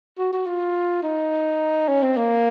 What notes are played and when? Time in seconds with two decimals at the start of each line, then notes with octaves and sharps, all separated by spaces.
0.18 F#4
0.33 F#4
0.46 F4
1.03 D#4
1.88 C#4
2.03 C4
2.17 A#3